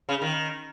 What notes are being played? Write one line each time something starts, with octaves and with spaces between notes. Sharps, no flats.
C#3
D#3